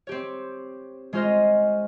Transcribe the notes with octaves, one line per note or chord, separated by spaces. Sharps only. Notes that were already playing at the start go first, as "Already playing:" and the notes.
C4 G4 C#5
G#3 C#4 F4 C5 D#5